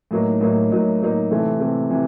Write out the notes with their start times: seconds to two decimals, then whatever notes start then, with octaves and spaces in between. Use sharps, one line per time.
0.11 A2 F#3 A#3 D#4
0.41 A2 F#3 A#3 D#4
0.71 A2 F#3 A#3 D#4
1.01 A2 F#3 A#3 D#4
1.30 C3 E3 A3 C4
1.60 C3 E3 A3 C4
1.90 C3 E3